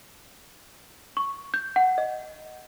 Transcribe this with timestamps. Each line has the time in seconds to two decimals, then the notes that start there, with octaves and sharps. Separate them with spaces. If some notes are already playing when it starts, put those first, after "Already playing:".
1.17 C#6
1.54 G6
1.76 F#5
1.98 D#5